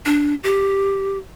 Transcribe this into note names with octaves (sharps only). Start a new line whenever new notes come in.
D4
G4